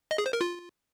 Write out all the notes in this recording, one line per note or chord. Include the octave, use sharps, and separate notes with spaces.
D#5
G#4
C5
A#4
F4